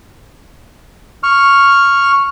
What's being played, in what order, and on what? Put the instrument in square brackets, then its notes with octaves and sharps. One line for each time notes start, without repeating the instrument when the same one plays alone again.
[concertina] C#6 F6